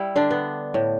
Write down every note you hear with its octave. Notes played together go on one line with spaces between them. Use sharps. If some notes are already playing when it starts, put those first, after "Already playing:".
Already playing: G3 E4
D3 D4
B3
A2